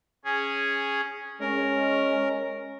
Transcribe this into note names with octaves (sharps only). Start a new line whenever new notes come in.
C#4 G#4
G#3 C#4 A#4